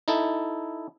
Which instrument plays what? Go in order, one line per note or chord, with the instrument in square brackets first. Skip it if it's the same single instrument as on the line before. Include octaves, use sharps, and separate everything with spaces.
[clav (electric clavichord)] D#4 E4 A4